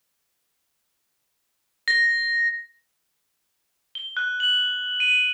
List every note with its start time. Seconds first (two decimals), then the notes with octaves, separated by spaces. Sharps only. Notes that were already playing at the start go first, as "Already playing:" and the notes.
1.88 A#6
3.95 G7
4.17 F#6
4.40 F#7
5.00 D#7